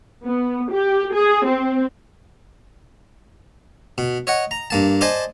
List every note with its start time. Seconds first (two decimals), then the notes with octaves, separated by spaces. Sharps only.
0.24 B3
0.72 G4
1.13 G#4
1.46 C4
3.98 B2
4.27 C#5 D#5 F#5
4.51 A#5
4.70 G2 A#3 A5
5.01 C5 D5 D#5 G#5 A5